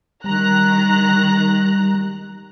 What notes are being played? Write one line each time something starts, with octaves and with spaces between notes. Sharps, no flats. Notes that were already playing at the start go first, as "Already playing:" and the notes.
D#3 G3 A#5 F#6